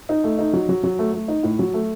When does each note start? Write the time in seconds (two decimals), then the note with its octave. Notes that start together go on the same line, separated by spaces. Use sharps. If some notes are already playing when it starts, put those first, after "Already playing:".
0.09 D#4
0.24 A3
0.39 D#4
0.53 F#3
0.69 F#3
0.83 F#3
0.99 A3
1.13 A3
1.28 D#4
1.43 A2
1.59 F#3
1.74 A3